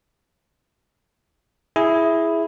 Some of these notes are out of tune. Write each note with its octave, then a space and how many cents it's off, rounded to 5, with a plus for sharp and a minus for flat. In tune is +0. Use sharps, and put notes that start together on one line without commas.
E4 +0 G#4 +0